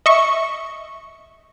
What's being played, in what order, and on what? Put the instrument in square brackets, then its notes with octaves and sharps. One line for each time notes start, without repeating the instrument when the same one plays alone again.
[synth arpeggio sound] D#5 E5 C#6